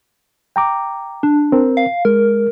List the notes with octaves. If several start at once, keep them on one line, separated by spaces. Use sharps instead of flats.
G5 A#5 D6
D4
C4 A#4
F5
G#3 A#4